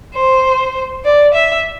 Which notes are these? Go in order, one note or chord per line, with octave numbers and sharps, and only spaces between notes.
C5
D5
E5